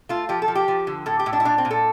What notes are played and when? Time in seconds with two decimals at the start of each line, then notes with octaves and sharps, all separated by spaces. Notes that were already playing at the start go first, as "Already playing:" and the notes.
0.09 A3 F4
0.29 F3 G4
0.42 A4
0.48 F3
0.55 G4
0.68 F3
0.87 D3
1.06 A2 A4
1.20 G4
1.26 A2
1.33 D4
1.40 E4
1.45 A#2 D4
1.58 C4
1.65 A#2
1.71 A4